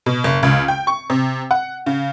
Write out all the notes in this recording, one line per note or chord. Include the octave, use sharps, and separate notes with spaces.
B2
F#1
C#2
G5
C#6
C3
F#5
C#3